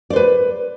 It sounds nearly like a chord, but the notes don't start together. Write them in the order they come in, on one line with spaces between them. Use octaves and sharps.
D5 C5 B4